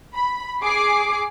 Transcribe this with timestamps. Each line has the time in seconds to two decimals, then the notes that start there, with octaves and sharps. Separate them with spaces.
0.14 B5
0.63 G#4 D6 C7